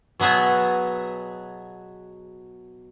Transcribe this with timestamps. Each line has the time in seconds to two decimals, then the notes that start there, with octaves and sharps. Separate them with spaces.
0.20 B2 F#3 B3 G#4 E5